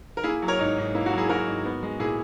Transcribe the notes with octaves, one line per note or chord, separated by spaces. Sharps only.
A#4
A#3 E4 G#4
F#3
A#4 C#5
G#2 D#4
G#2
A#3 E4
D#4 F#4
F#3
E4 G#4
G#2 F#4 A#4
G#2
B3
G#3
A#2 E4 G#4